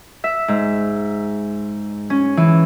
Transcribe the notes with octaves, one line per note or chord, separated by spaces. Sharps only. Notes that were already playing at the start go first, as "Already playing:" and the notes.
E5
G#2
C#4
E3